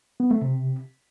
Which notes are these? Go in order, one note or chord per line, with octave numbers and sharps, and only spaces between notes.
B3
A3
C3